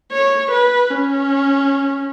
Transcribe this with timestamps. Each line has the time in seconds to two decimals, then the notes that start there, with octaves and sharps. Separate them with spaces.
0.12 C#5
0.52 B4
0.90 C#4